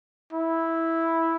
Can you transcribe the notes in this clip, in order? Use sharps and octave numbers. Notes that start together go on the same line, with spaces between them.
E4